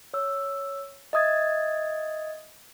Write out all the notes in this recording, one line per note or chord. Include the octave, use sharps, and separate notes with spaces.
C#5 E6
D#5 E5 D#6 G#6 A6